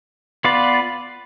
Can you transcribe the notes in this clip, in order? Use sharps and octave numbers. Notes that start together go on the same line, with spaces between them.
B3 F4 B4 D5